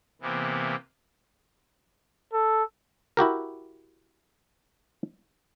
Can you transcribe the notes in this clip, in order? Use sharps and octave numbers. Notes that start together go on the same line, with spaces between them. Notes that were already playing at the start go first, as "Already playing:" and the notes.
C3 E3 A#3 B3
A4
E4 F#4 G4 A#4